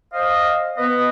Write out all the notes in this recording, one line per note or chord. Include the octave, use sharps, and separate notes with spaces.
C5 D#5 F5
B3 B4 D#5